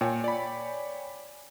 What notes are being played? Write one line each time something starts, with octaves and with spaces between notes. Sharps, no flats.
A#2 C#5 G5 G#5
D5 B5